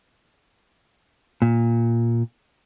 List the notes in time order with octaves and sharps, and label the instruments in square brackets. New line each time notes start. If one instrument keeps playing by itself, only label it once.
[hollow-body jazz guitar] A#2